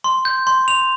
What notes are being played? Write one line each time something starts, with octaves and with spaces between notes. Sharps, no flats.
C6
G6
C6
F7